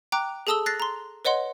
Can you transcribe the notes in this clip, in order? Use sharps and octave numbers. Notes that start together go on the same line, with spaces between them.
G5 A#5 D6 F#6
G#4 A4 A5 D#6 E6 G7
F#6 A6 A#6 C7
A#5 C6
B4 C#5 D#5 F#5 C6